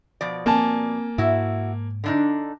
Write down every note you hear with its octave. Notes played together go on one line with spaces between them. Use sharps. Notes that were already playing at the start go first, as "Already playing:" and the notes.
B2 F3 D5
A#3 C4 G#5 A5
G#2 E4 F#4
D3 D4 D#4